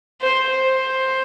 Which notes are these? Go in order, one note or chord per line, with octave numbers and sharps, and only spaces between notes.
C5
C5